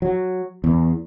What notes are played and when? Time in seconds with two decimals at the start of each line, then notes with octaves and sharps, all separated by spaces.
0.02 F#3
0.64 E2